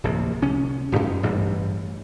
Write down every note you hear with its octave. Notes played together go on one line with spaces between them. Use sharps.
D1 A#1 C3
C2 C#4
D1 F#2
A1 G2 E3 G3